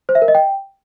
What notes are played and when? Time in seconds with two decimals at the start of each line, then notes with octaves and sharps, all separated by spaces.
0.09 C5
0.15 E5
0.22 A#4
0.28 D#5
0.35 G5